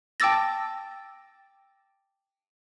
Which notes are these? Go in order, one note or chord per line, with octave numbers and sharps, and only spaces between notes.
G5 A5 D6 E6 A6 A#6